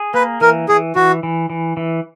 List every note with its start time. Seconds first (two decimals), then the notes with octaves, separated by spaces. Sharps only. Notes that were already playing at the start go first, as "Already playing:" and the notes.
Already playing: G#4
0.14 A#3 B4
0.41 E3 A#4
0.69 E3 G#4
0.96 E3 F#4
1.23 E3
1.50 E3
1.77 E3